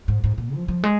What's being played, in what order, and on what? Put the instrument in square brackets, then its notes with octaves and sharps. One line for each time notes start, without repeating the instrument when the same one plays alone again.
[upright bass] G#2
G#2
A#2
F3
F3
G#3